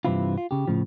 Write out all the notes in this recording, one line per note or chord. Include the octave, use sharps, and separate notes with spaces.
G2 C3 E3 C4 E4 F4
F4
C#3 G4
A2 C#3 F3